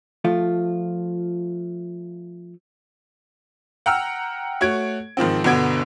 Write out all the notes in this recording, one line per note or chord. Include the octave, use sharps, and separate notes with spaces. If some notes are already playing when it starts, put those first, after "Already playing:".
F3 A3 F4
F#5 G5 A#5 E6 F6
A3 F#4 C#5 G#6 D7
G#2 D#3 F3 C4
G1 B2 D3 B3 G#6 D7